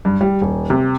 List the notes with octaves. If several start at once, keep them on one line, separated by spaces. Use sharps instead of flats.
G2
G3
D#1
C3